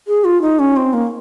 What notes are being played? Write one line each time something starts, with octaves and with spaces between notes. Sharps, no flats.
G#4
F4
D#4
C#4
C4
A#3